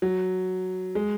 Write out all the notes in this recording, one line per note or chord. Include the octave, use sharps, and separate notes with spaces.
F#3
G#3